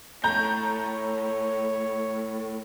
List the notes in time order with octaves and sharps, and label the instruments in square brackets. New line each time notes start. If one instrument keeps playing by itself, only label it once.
[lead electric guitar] A2 [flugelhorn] C#5 [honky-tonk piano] A#5 G6